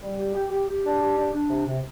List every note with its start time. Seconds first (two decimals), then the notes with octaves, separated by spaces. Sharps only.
0.01 G3
0.17 G4
0.35 G4
0.50 G4
0.68 G4
0.84 D4
1.01 G4
1.18 D4
1.34 D4
1.50 C3
1.67 C3